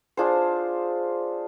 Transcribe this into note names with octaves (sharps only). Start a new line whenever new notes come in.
D4 F4 G#4 C5